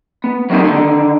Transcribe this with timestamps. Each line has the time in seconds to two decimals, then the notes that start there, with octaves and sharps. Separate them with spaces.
0.24 B3
0.50 F#3 G3 A#3 C4 C#4 D#4
0.64 D3 D#3